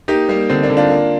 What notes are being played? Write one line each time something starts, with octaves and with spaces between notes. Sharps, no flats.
A#3 D#4 G4
G3 A#3
D3 C4
A#3 D4
D3
D4 F4
A#3